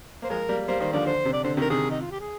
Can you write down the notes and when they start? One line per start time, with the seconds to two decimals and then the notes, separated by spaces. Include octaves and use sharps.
0.22 A#3 C5
0.30 F3 G#3 A#4
0.49 G3 A#3
0.68 G3 A#3 C5
0.80 D#3 G3 C5
0.93 D3 F3 D5
1.06 D3 C5
1.25 C3
1.33 D5
1.44 D3 C5
1.57 C3 D#3
1.61 A#4
1.70 C3 D#3 G#4
1.91 D#4
2.01 F4
2.11 G4
2.20 G#4